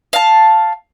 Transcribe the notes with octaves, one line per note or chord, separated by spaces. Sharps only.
F5 A5